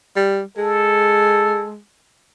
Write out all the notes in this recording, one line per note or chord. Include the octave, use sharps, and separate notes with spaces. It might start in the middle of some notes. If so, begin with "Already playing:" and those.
G3
G#3 A4